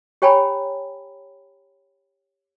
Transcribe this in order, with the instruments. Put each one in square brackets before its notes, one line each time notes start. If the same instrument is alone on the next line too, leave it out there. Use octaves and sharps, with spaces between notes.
[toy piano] G4 C#5 G5 G#5 A#5 B5